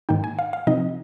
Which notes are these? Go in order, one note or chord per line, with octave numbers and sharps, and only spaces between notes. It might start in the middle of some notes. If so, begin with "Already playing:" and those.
G#2 D#3 A#3 D#4 G5
G#5
F5
F5
C3 F3 C4 D#4 D#5